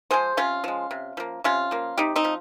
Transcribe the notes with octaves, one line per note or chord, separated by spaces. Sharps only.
F3 G#3 G#4 C5
C3 C#4 F4
F3 G#3
C3
F3 A#3
C3 C#4 F4
F3 A#3
C3 D#4 G4
C4 D#4
F3